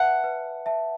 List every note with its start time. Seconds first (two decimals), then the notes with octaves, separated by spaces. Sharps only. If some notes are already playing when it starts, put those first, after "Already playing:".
Already playing: B4 E5 F#5 A5
0.24 B4
0.66 E5 A5